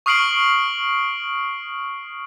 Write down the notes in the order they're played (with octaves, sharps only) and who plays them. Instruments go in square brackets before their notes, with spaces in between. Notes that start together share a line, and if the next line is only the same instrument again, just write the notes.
[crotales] C#6 D#6 F6 C7 D7 F#7